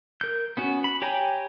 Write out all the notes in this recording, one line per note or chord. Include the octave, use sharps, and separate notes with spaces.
A#4 G6
B3 C#4 F#4
B5
G4 C#5 G5 G#5 A#5